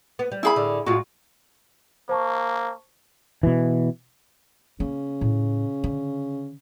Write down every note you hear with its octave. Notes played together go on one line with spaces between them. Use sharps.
B3
G3
E4 G#4 B5
A2 D3
A2 G#3 F4 F#4
A#3 C5 A5 C#6
B2 E3
C#3 A#3
A2
D3